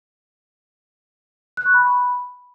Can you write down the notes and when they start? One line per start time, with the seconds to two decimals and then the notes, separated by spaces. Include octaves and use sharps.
1.57 F#6
1.66 C#6
1.74 B5